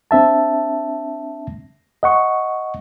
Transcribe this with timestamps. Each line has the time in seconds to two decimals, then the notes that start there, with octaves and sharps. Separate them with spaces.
0.11 C4 D4 E5 A5
2.03 D#5 F#5 C#6